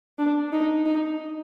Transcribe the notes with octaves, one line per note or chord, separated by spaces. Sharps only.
D4
D#4
D#4